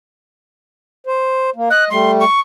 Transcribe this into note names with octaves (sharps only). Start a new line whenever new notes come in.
C5
A#3
D#5 F#6
G3 A3 C6
C#6